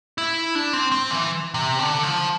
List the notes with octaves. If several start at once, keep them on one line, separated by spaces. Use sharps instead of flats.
E4
D4
C4
C4
E3
C3
D3
F3